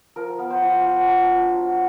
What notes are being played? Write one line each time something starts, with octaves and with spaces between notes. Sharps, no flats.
F3 A#4
B3
C5
F3
F3 F#5
D4
F3
F#3